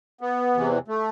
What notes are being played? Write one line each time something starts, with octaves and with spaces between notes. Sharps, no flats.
B3
E2 C3 E3
A3